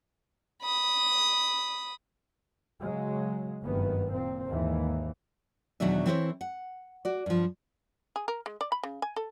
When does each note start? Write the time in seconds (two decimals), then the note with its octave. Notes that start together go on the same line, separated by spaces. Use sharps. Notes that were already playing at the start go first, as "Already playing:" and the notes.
0.62 B5 D#6
2.80 C#3 F#3 G#3
3.63 F#1 G2 D#3 B3
4.11 A#2 C4
4.48 D#2 G#2 E3
5.80 E2 B2 D#3 F#3 D4 E5
6.06 E3 C4 E4 A4 C5 C#5
6.41 F#5
7.05 F#4 D5
7.26 G2 F3
8.16 G#4
8.28 A#4
8.46 G#3
8.61 D5
8.72 B5
8.83 C#3
9.02 G#5
9.16 A4